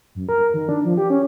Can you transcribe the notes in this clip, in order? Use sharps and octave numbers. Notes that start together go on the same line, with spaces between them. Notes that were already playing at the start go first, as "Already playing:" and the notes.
F#2
A#4
D#3
D4
F3
G4
C#4